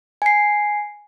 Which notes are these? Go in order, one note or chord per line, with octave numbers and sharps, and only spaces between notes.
G#5 C7